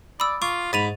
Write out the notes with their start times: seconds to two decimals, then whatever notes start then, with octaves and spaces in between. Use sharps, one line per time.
0.20 D5 B5 D#6 E6
0.42 F4 C#6 D6
0.73 G#2 B5 A6 D#7 F7